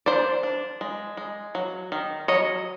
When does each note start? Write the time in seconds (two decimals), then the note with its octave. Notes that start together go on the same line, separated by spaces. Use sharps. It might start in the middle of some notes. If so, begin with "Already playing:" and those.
0.06 D4 C5 D5
0.43 D4
0.81 G#3
1.17 G#3
1.55 F#3
1.92 D#3
2.28 F#3 C#5 D#5